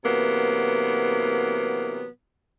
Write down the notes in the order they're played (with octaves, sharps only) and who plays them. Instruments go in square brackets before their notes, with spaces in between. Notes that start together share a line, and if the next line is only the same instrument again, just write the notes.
[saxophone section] C3 E3 F#3 A#3 B3